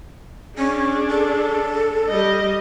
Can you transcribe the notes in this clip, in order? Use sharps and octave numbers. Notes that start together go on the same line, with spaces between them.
C#4 D4 G#4
A4
G3 D#5